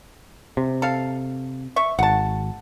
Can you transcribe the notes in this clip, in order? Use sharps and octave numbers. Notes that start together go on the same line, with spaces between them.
C3
A4 F5
E5 C#6
G#1 F#5 A5